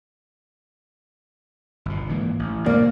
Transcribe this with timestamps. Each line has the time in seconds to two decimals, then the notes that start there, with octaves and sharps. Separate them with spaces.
1.86 G1 B2
2.09 G#2 E3 A#3
2.39 A1
2.66 D2 B2 G3 A#3 D5